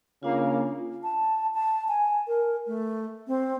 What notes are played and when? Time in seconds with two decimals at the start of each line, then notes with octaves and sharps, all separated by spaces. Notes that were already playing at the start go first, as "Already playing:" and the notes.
0.23 C#3 A#3 D4 F4 F5
1.03 A5
1.54 A5
1.88 G#5
2.28 A#4
2.67 A3
3.27 C4